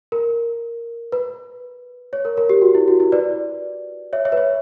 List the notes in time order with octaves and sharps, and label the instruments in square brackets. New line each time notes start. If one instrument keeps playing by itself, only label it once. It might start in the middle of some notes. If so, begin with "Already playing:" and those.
[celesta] A#4
B4
C#5
A#4
A#4
G4
F#4
E4
F#4
E4
B4 D5
C#5 E5
C#5 E5
B4
C#5